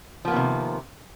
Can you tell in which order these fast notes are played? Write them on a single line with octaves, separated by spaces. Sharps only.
F3 A#3 B3 D#3 C3